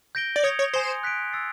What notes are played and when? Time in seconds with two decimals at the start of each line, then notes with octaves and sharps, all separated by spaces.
0.15 G6 A#6 D7 G7
0.36 D5
0.44 C#5 D#6 G#6 C#7 F7
0.59 C#5
0.73 C5 G#5 C6 D#6
1.03 F#6 B6 D7
1.33 E6 A6 C7